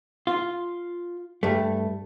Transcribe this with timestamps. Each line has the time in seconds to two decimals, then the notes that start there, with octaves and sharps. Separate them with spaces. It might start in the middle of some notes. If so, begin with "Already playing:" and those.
0.27 F4
1.43 G2 A3